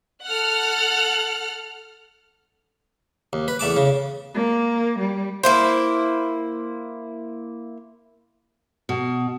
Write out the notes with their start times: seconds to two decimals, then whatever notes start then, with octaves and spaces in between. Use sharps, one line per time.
0.23 A4 F#5 F6 F#6
3.33 D#2
3.48 B4
3.59 E2 A3 A5 D6
3.77 C#3
4.34 A#3
4.98 G3
5.43 A#3 E4 C5
8.89 B2